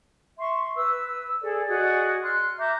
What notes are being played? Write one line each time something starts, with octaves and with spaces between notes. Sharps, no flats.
E5 C6 C#6
B4 E6
G#4 A4 D5
F#4 G#4 D5 D#5
C6 F6 F#6
E5 A#5 D6 G6